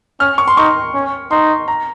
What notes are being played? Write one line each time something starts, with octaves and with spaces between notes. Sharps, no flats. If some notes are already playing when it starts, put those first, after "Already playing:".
C#4 F6
C#6
C6
D#4 C#6
C#4
D#4 C6
A#5